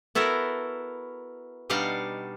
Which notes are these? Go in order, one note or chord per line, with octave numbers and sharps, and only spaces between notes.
B3 E4 F#4 A4 A#4
B2 G3 D4 D#4 F5 F#5